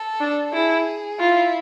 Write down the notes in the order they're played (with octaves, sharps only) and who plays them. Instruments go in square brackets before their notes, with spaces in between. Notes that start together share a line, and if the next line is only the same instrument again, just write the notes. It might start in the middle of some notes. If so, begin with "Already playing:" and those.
Already playing: [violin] A4
[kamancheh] D4
[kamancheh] E4 [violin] G#4
[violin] E4 [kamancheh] F4